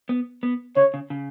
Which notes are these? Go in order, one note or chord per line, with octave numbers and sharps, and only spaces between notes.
B3
B3
C#3 C#5
C#3
C#3